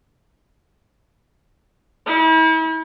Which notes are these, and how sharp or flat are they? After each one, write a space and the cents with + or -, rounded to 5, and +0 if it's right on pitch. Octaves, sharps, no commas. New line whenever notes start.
E4 -40